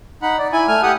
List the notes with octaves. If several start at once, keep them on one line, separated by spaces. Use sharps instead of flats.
D#4 F#5 B5
D5
E4 G#5
A3 G#5 F6
G4 F#5 D#6